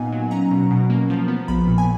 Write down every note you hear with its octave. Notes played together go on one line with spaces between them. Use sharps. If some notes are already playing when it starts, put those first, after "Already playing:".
Already playing: A#2 A#3 B3 D#4 D#5 F5 F#5 G#5
F#3
C#4 A#5
B2
B2
A#3
F3
B3
A#1 B5
A#2
G#5